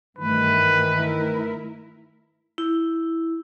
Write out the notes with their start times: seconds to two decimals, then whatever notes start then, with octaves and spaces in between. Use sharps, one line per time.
0.18 G2 D#3 E3 A3 B4
0.90 A3 E4 A#4
2.58 E4